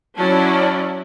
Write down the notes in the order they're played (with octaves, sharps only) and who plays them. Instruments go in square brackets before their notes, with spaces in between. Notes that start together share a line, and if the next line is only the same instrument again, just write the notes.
[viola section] F#3 C#4 E4 [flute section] D5 A5